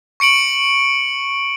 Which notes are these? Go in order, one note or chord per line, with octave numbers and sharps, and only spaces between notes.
C#6 C#7 D7 F#7